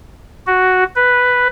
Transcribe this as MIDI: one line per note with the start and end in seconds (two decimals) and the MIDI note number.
0.47 0.84 66
0.96 1.48 71